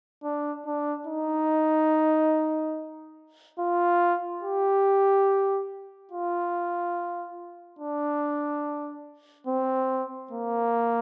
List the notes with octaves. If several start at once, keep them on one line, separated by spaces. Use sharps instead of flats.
D4
D4
D#4
F4
G4
F4
D4
C4
A#3